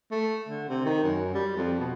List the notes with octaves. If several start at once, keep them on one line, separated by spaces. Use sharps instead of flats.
A3
D3
C3
D#3
F#2
G3
F2
B2